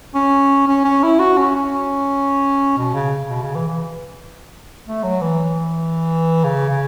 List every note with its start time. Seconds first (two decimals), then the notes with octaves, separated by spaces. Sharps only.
0.15 C#4
0.68 C#4
0.84 C#4
1.03 E4
1.19 F#4
1.38 C#4
1.55 C#4
2.78 B2
2.94 C#3
3.29 B2
3.42 C#3
3.55 E3
3.68 E3
4.87 A3
5.03 F#3
5.21 E3
6.44 C#3
6.69 C#3